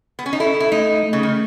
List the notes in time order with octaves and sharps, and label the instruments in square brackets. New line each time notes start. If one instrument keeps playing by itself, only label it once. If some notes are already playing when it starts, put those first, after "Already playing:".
[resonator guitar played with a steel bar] B3
C#4
D#4
[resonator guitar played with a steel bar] E4 [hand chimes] A4
[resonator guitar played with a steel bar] E4
[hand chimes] A3 [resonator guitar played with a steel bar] D#4
[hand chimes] A3
[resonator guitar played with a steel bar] C#3
D#3